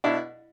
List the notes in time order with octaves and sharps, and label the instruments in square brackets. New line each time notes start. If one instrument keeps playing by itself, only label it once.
[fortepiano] B2 D4 E4